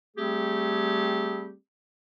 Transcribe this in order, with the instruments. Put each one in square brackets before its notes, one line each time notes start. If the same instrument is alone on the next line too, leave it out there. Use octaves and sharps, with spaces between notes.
[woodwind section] G3 A3 C4 G4 G#4